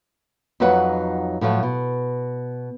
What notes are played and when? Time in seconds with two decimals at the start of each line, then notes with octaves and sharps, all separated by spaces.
0.60 F2 F#3 D#4 B4 C#5 F#5
1.41 A2 F3 F#3 A3
1.63 B2